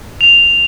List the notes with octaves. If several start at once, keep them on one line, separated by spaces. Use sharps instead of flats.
F7